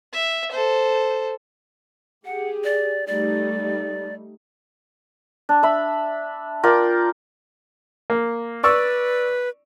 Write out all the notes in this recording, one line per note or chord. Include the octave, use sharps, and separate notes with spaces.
E5
A4 C5
G4 G#4 F#5
D5
G3 A3 D#4 D5
D4
E5 B5
F4 A#4 D5 G5
A#3
B4 D5 C#6 E6